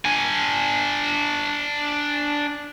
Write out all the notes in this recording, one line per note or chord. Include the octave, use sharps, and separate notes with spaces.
D4 G#5